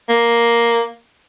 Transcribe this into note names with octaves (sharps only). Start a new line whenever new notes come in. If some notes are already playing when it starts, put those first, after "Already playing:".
A#3